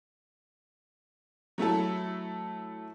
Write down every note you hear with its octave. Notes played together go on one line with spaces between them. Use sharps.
F#3 A3 E4 A4